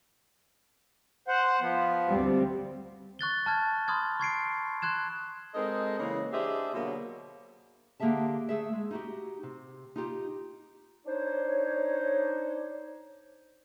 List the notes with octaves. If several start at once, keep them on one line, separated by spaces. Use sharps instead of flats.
C5 F#5
F3 B3
D2 G3 C4
C#6 F#6 A6 G7
A5 F6 G#6
B5 C6 D#6 F6 G#6
C#6 G#6 C7 D7
C6 F#6 G#6 E7
G#3 C4 D#4 A4 A#4 D#5
C#3 E3 G#3 A#3
D4 G4 G#4 C5 D#5 E5
B2 D3 F#3 A#3
D3 A#3 G4 G#4 E5 A5
A3 G#4 E5
G#3
D#4 F#4 G4
C3
D#4 F4 G4
D4 D#4 C5 C#5